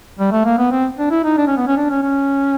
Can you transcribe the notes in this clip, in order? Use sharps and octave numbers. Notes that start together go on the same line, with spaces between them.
G3
A3
A#3
B3
C4
D4
E4
D#4
D4
C#4
B3
C#4
D4
C#4
C#4